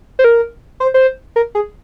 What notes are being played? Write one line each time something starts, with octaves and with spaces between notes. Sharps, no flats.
C5
A#4
C5
C5
A#4
G#4